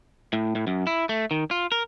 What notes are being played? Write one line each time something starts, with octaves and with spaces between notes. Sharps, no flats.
A2
A2
F#2
E4
A3
D#3
F4
A#4